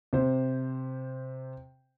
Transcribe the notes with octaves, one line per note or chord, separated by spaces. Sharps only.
C3 C5